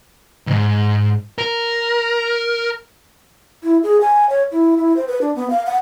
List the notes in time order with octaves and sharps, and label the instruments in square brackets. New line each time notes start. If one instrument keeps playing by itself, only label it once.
[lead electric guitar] C#2 G#2
A#4
[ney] E4
G#4
G#5
C#5
E4
E4
C5
B4
D4
B3
F5
F#5